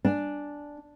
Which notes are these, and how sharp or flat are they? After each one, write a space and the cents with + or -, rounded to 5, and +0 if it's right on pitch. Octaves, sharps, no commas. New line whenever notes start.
D4 +0 G#5 +0